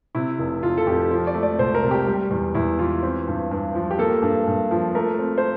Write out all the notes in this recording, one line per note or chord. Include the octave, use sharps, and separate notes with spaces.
C3 E4
F1
F1 F4
A4
F2 G4
F3
D5
A3
D5
C2 C5
A#4
C3
G4
G3
E2
E2 E4
E3 F4
C4
G2
G2
F3
G4
A#3 A4
G2
G2
F3
A3 A#4
C4
C5